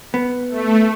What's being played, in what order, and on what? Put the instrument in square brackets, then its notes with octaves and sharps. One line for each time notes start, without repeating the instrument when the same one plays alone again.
[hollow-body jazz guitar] B3
[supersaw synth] A3